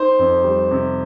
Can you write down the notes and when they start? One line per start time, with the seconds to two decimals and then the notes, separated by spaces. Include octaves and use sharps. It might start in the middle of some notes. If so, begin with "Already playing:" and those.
Already playing: D#4 C5
0.19 F2
0.44 G3
0.71 C3